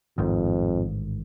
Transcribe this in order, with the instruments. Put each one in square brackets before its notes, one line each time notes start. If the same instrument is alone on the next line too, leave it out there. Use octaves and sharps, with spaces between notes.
[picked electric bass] A1 G#2 D#3 [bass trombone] F2